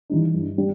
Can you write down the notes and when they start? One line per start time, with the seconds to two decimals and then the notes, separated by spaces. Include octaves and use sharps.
0.10 E3 G3 D#4
0.34 G2
0.58 G3